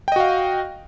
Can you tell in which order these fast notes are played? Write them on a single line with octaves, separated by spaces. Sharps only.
G5 D#5 F#4 F5